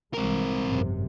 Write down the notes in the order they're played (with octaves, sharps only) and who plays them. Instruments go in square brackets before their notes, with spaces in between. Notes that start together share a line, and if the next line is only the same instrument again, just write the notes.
[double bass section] C2 E3 G#3 [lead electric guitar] C4 A#4
[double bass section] G#1 F#2 C3